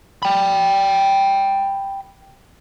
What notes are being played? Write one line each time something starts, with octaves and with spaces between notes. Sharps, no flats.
G5 B5